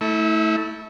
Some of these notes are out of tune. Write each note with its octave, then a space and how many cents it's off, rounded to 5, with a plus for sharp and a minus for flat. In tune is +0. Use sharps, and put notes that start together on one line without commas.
A3 +0 E4 -30